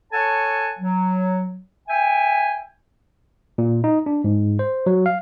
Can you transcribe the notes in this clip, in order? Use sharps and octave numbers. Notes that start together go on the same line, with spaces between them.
A4 C#5 F#5 G#5 A5
F#3
E5 G5 G#5
A#2
D#4
D4
G#2
C5
F#3
F5